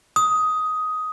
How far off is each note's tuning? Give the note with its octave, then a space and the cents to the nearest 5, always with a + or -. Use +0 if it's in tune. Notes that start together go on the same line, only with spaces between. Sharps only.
D#6 +10